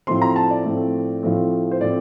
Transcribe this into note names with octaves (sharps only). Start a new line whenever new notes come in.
A2 F3 A3 C4 C6
A#5
A5
D5
A2 F3 A3 C4
A2 F3 A3 C4
C5
A2 F3 A3 C4 D5